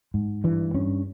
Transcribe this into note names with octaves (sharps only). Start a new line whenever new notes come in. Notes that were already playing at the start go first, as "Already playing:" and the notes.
G#2
G2 E3
G2 C#4